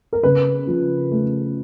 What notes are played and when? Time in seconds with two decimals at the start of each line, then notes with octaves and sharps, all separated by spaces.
0.13 A#4
0.23 C#3 B4
0.67 F3
1.11 A3